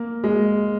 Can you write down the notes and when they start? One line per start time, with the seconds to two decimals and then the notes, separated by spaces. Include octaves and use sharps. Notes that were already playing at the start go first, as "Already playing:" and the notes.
Already playing: A#3
0.24 G#3